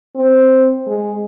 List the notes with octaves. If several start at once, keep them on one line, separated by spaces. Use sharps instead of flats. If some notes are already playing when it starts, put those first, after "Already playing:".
C4
G#3